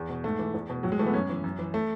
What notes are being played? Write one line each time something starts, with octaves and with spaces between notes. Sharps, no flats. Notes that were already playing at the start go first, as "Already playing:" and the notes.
Already playing: E2
B2
G#2 A3
E3
E2
B2
A2 F#3
G#3
E3 A3
B3
F#2 C#4
E3
F#2
E3
A3